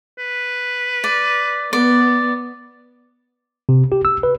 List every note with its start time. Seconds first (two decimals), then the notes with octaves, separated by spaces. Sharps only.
0.19 B4
1.04 D5
1.73 B3 D5
3.69 C3
3.92 G4
4.05 E6
4.23 B4